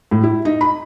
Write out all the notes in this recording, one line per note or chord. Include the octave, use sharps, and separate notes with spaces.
A2
E4
D#4
B5